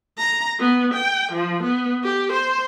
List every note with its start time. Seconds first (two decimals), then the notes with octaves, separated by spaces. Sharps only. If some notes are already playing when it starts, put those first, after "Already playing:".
0.18 A#5
0.60 B3
0.94 G5
1.32 F3
1.63 B3
2.04 G4
2.33 C5